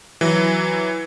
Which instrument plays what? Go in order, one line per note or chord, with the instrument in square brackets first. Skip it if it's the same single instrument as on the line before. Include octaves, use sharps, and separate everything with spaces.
[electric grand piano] E3 F#3